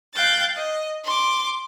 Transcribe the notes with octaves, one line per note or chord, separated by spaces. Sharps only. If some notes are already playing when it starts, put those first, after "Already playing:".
F5 G5 F#6 G6 A6
D#5
C6 D6